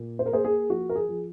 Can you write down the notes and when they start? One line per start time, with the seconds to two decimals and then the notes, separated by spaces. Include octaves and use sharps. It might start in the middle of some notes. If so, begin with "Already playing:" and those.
Already playing: A#2 A#3
0.19 C5
0.26 A#4
0.32 A#3 G#4 C5
0.45 G#4
0.70 F3 F#4
0.89 A#4
0.95 G#4
1.08 F3